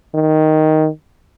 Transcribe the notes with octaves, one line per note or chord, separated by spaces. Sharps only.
D#3